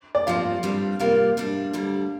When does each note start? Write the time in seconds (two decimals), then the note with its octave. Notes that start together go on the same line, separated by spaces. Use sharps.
0.15 D5
0.27 G2 F3 C4 F5
0.63 G2 G3 C4 F4
0.99 C3 G3 A#3 F4 F5
1.37 C3 G3 D4
1.73 D2 D3 G3